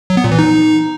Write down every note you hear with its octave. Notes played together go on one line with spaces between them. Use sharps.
F#3
B3
A#2
E3
D#4